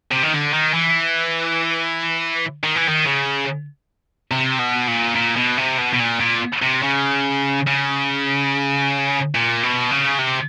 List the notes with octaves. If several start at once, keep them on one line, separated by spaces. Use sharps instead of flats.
C3
D#3
D3
D#3
E3
D#3
E3
D#3
C#3
C3
B2
A#2
A#2
B2
C3
B2
B2
A#2
A#2
C3
C#3
C#3
A#2
B2
C#3
C3